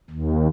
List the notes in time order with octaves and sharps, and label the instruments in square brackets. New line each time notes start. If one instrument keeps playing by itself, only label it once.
[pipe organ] D#2